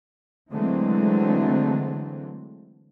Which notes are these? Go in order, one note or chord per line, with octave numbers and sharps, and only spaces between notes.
D3 E3 F#3 G#3 A3 C4